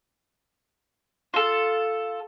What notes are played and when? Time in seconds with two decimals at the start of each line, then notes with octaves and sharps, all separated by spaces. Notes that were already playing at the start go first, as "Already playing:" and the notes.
1.34 F4 A4